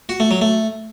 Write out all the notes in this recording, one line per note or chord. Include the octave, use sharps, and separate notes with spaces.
F#4
A3
F#3
A3